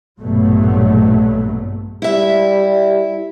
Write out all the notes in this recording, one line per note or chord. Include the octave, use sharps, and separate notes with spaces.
A#1 G2 B2 F#3 A3
G3 E4 E5